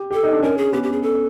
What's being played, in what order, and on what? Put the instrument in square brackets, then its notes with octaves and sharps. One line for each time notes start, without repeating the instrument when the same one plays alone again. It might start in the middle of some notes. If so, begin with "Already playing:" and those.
Already playing: [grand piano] G4
[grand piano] G4 [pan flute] A4
[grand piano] D#4
D4
[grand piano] C#4 [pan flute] A#4
[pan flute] G#4
[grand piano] B3 [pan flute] G4
[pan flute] G4
G#4
A4